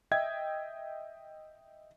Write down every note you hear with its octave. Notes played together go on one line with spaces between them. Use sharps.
D#5 E5 G5 G#6